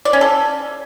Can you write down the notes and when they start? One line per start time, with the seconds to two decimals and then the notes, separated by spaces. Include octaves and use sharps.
0.05 D5
0.13 C#4
0.21 A4